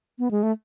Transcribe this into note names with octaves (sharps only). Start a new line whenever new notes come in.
B3
G#3
A3